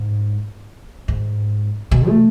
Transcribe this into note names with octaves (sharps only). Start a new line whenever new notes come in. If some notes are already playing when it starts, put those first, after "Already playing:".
Already playing: G#2
G#2
B2
A3